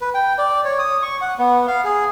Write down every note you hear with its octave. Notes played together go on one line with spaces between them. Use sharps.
B4
G5
D5
C#5
D#6
C#6
F#5
B3
F5
G#4